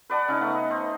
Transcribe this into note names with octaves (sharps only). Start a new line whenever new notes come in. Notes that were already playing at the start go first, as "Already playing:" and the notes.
B4 D5 F#5 A5
C#3 D#4
A3 B3
D#5
C5